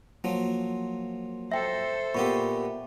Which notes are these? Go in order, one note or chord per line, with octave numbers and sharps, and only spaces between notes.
F3 F#3 A#3
A4 C5 E5 G5 A#6
A#2 B3 G4 B5 C#6